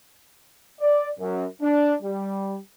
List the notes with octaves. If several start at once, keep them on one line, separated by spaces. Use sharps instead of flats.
D5
F#2
D4
G3